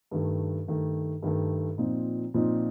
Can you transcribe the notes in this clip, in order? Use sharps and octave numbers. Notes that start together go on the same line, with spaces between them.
G2 D#3 A3
G2 D#3 A3
G2 D#3 A3
A#2 F3 C4 D#4
A#2 F3 C4 D#4